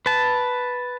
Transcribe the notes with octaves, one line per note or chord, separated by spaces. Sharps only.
B4 A5